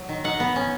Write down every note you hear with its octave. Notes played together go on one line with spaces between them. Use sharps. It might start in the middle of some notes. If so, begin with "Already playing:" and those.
Already playing: F#3
D#3
D#4 F#5
B3
C#4